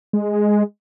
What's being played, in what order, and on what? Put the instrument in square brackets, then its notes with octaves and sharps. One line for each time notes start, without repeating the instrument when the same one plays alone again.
[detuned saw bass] G#3